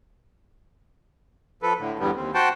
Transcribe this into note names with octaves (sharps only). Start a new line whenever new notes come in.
F3 A4 B4
A2 D3
E2 G2 D3 G3 B3
D#2 C4
F#4 C5 F#5 G5 A5